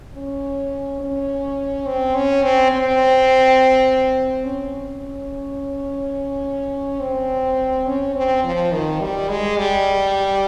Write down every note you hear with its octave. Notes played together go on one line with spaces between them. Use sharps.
C#4
C#4
C4
C#4
C4
C4
C#4
C4
C#4
C4
F3
D#3
G3
G#3
G3